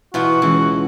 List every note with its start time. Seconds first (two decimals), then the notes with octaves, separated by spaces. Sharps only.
0.14 B2 E3 F4 F#4
0.42 C#2 E3